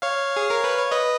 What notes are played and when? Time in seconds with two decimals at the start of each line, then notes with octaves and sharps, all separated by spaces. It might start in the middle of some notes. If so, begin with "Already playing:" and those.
0.02 C#5 F5
0.36 G#4
0.50 A#4
0.64 B4
0.78 C#5
0.91 B4 D#5